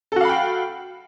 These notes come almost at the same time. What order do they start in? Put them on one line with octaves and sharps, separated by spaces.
A4 F#4 F5 B5 G5